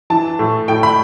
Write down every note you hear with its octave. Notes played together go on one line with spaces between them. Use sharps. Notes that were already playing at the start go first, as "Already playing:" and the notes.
E3 A5
A2
A2 G5
B5